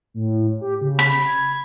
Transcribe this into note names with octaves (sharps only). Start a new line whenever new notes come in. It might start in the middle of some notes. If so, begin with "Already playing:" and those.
A2
G4
C#3
B5
G#6